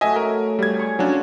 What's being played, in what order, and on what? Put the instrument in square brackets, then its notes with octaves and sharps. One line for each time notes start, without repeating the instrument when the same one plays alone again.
[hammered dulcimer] F#3 A3 F#4 [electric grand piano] D#5 E5 G#5
[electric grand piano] A#4
G3 G#6
[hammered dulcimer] G#4 C#6
[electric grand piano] F#3 C#4 D4 [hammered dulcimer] F4 F#4